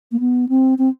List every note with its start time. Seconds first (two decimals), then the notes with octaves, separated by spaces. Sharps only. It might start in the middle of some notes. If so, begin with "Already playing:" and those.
0.12 A#3
0.20 B3
0.49 C4
0.78 C4